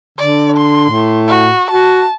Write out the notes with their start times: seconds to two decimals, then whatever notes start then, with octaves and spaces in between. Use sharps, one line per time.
0.18 D3 D5
0.57 C6
0.89 A2
1.28 F#4
1.71 F#4 A5